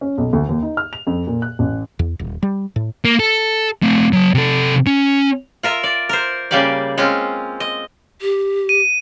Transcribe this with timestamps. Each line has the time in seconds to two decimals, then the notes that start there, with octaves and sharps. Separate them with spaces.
0.01 C#4
0.18 B1
0.33 D2
0.49 D#2
0.62 D#4
0.77 F6
0.93 F7
1.07 F2
1.27 A#2
1.42 F#6
1.59 A1
1.99 E2
2.19 D#1
2.43 G3
2.76 A2
3.05 A#3
3.20 A4
3.83 A3 C4
4.13 F#3 A5
4.34 C3 A4
4.87 C#4
5.63 F4 A#4 E5
5.84 D5
6.09 A#4 C5
6.51 C#3 G3 A#3 G4 D5
6.98 G#3 C4 C#4 F4
7.60 D#5
8.21 G4
8.69 D#7